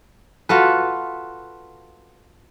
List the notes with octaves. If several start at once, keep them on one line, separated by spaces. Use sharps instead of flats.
F4 F#4 A4 B4